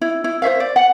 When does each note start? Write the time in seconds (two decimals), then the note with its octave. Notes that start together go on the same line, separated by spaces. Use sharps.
0.01 E4
0.24 E4
0.42 C5 C#5 E5 F5
0.60 D5
0.76 F#5